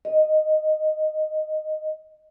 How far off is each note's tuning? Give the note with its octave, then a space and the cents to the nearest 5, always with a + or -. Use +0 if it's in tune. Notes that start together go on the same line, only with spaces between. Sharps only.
D#5 -5